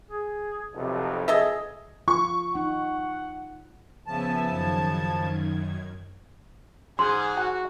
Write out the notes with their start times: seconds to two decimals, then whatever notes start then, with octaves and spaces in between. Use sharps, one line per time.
0.11 G#4
0.73 B1 F2 C3
1.28 G#4 A4 D#5 E5
2.08 F4 C#6
2.55 D#4 F#5
4.07 C#3 F3 B3 E5 G#5 A5
4.49 F#2 D#3 G#6
6.99 G#2 G#4 C6
7.37 F#4 F#5